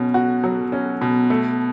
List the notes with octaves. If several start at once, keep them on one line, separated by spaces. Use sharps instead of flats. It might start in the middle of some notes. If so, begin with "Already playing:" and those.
Already playing: B2 C#4
F#4
F#3
C#4
B2
A3